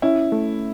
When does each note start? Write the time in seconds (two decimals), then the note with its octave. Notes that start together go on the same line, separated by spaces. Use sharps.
0.02 C#4 E4
0.32 A3